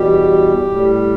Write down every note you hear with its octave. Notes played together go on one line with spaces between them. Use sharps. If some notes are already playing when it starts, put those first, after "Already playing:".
Already playing: E2 B2 G3 G4
A2 G3